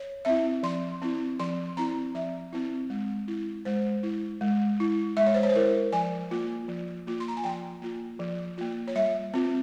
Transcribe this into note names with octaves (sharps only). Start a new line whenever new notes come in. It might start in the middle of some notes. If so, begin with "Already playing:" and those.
Already playing: C#5
C4 E4 E5
F3 C6
C4 E4
F3 C6
C4 E4 A#5
F3 E5
C4 E4
G#3
E4
G#3 C5
E4
G#3
E4
G#3 E5
C#5
C5
C#5
C5
E4 A#4
F3 G#5
A#3 F4
F3
A#3 F4
C6
A#5
G#5
F3 G5
A#3 F4
F3
A#3 F4
C#5
G3 E5
C4 F4